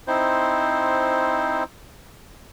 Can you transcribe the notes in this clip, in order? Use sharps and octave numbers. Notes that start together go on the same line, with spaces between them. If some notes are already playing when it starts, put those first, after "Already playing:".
C4 D#4 E4 C5